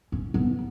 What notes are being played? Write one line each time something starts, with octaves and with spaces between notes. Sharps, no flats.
C#4
B3